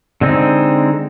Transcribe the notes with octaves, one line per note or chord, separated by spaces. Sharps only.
D3 G#3 C4 D#4